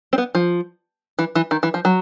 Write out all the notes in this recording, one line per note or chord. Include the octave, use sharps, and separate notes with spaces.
C4
B3
F3
E3
E3
D#3
E3
F3
F#3